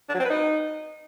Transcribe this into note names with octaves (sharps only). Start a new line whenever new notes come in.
D4
F#3
C4
B4
D#4